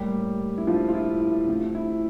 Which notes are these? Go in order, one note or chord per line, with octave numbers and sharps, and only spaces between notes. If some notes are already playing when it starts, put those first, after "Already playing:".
Already playing: A2 G3 A#3 G4
E4
F3 F4
F4
E4
E4
C3 F3 A3
E4